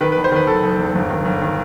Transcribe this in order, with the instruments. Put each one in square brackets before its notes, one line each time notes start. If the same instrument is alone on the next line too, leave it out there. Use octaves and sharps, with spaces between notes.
[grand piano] D#3 B4
B4
E2
C5
D#3 B4
F#1 A4
F#1
E2
G1
D#3
G1
D#3